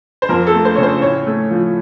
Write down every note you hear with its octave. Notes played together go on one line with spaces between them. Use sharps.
C5
F2 A#4
A4
A3
C5
C#3 C#5
C5
A2 C#5
A3
F3